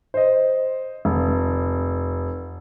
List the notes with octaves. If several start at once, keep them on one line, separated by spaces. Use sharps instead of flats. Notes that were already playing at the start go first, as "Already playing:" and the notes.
C5 D#5
F1